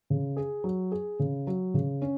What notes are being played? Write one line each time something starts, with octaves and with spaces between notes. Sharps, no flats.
C#3
G#4
F#3
G#4
C#3
F#3
C#3
C#4